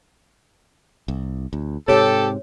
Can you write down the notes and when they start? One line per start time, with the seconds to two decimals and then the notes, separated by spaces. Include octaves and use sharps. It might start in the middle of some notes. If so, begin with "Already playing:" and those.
1.08 C2
1.53 D2
1.88 G#2 C3 G4 A4 C#5